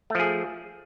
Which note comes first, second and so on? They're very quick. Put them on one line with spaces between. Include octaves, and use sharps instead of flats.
A3 F3 G#4